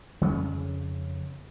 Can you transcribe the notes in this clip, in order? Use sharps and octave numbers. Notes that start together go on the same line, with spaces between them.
F2 C#3 C#4